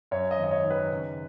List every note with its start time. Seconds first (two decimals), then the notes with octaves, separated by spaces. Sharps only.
0.11 F#2 C#5
0.31 D#5
0.37 G#1
0.44 D#5
0.51 C#5
0.64 D#3
0.70 B4
0.91 C#3